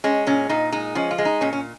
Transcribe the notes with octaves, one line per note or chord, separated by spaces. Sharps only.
G#3 C#4
A#2 C#4
A#2 D#4
G#3 D#4
F3 C#4
F4
G#3
D#4
A#2 C#4
C#4